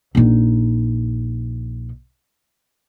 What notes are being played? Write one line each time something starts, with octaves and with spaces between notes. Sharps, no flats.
A#1 D#4